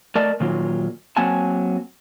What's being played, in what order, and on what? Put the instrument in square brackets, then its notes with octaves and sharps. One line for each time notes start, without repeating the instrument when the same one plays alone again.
[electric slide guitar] A3 A#4 D5 D#5 A5
A#2 D#3 F#3 A#3 F4
F#3 A#3 C4 F#5 G#5 A5